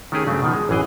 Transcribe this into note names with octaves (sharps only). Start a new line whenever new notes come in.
D#3 A3 C#4 G4 G#4
G2 C#3 F#3 A3 C4
B2 D#3 F3
G#3
A1 F#2 E3 G#4 G5